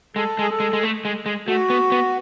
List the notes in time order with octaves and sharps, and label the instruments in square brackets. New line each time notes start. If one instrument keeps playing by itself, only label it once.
[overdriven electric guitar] G#3 [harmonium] A4
[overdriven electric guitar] G#3 [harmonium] G#4
[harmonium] A4
[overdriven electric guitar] G#3
G#3
A3
G#3
G#3
[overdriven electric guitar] A3 [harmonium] F#4
[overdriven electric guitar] B3
B3